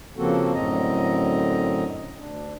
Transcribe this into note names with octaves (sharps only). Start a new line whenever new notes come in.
C#3 F3 A#3 C4 F#4 A4
F#2 A2 D3 C4 D#5 A#5
D2 D4